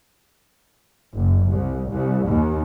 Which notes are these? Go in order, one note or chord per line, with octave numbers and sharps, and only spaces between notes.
F#1
C2
C2
D#2